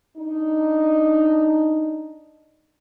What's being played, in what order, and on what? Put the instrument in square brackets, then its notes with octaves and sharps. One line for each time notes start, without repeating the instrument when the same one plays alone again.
[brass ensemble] D4 D#4